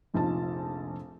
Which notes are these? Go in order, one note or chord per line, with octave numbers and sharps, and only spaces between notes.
F1 A#1 D#4 F4 A5